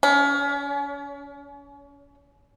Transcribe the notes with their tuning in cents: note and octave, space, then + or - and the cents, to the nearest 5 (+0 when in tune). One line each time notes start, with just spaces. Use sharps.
C#4 +35